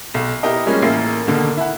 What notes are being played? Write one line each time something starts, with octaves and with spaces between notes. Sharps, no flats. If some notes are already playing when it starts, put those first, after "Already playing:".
B1
B3 E4 G4 A#4 D#5
F3 G3 G#3 A#3 C#4
A1 A#3 E4 C7
D#2 B2 D3 A#3
E4 F#5